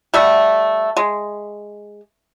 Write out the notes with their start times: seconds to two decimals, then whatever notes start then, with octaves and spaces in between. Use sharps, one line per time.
0.14 G3 A3 E5 F#5
0.97 G#3